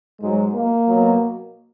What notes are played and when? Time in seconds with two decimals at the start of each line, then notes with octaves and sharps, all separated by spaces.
0.20 G#2 F#3 G#3
0.53 A#3
0.88 B2 F#3